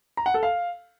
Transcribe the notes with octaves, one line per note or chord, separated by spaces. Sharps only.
A#5
F#5
A4
F5